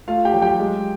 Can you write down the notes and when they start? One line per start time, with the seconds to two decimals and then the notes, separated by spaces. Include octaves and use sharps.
0.08 A3 F4 F5
0.25 G4 G5
0.34 F#3
0.42 G4 G5
0.59 G#3